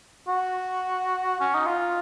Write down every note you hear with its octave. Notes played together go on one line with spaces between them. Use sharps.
F#4
C#4
D#4
F4